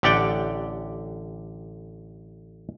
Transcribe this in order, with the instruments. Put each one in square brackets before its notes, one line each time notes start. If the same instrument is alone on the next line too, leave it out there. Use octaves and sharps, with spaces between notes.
[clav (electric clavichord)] A1 D3 G4 D5 F#5 G5